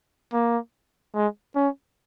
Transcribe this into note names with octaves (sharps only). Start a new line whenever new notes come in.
A#3
G#3
C#4